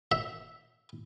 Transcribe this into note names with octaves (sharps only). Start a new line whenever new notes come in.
E5